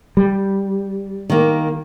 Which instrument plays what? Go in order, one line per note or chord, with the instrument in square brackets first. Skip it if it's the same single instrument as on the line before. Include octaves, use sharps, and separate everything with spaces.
[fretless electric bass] G3
[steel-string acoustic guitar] D#3 A#3